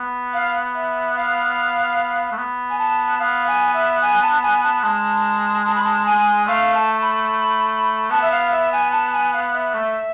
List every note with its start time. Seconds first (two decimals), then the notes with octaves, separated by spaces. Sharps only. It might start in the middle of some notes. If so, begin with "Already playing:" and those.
Already playing: B3
0.33 F5
0.75 E5
1.16 F5
2.32 A3
2.38 B3
2.70 G#5
2.78 A5
3.19 B3 F5
3.47 G#5
3.74 E5
4.02 G#5
4.22 A5
4.42 G#5
4.63 A5
4.83 G#3 A5
5.65 A5
5.75 B5
5.84 A5
6.06 G#5
6.47 A3 F5
6.75 A5
7.01 B5
8.10 B3 A5
8.22 E5
8.32 F5
8.51 E5
8.72 G#5
8.92 A5
9.13 G#5
9.33 F5
9.53 E5
9.74 A3